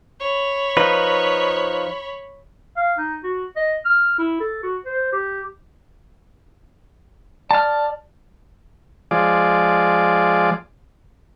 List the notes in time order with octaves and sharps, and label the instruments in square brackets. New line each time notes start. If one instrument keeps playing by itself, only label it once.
[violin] C#5 B5
[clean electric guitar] F3 D#4 B4
[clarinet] F5
D#4
F#4
D#5
F6
E4
A4
F#4
C5
G4
[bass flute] D5 [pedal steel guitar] A5 F6
[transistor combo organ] F3 G#3 D5